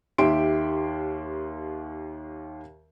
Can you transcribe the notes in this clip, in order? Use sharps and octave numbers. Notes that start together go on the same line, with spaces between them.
D#2 D#3 G4 E5 C6 D7